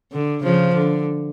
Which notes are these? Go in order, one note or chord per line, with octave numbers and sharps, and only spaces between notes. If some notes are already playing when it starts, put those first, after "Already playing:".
D3
C#3 F3
D3